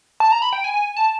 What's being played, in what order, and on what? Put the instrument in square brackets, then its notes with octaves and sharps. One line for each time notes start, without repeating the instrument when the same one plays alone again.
[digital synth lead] A5
A#5
B5
G5
G#5
A5